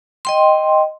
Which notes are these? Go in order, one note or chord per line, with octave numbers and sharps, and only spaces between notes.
D#5 G5 C6